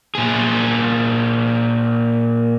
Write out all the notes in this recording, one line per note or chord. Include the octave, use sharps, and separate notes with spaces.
A#2 G#4